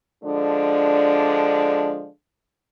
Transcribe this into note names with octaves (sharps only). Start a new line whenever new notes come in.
D3 F3 G#3 D4